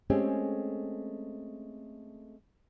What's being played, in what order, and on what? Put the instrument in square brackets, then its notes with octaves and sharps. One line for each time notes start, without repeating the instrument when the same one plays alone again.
[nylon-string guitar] G#3 A3 C4 C#4 G4 G#4